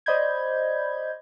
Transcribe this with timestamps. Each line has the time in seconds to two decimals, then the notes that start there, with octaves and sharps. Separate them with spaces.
0.06 C5 D5 D#5 B5 G6 G#6